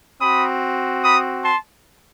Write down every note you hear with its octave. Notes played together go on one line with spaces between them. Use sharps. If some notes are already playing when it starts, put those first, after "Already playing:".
C4 F#4 B5 D#6
B5 D#6
A5 C6